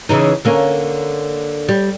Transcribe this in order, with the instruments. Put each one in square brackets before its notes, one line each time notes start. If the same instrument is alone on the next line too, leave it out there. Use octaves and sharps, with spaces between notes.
[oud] C#3 E3 D#4
D3 A#3 C#4
G3